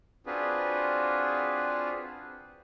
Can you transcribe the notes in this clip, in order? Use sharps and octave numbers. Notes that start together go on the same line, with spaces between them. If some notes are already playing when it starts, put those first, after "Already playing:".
C4 D4 F4 F#4 G#4 B4